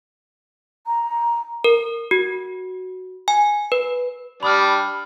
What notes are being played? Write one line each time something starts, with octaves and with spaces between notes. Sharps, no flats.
A#5
A#4
F#4
G#5
B4
G3 D4 B5 D#6 F6